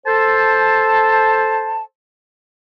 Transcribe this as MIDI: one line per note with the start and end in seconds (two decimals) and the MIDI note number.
0.07 1.83 69
0.07 1.83 72
0.07 1.83 81